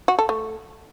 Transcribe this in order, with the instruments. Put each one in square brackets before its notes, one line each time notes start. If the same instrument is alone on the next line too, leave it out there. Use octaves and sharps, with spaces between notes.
[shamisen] F#4
A4
A3